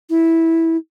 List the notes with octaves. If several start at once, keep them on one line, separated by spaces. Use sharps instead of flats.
E4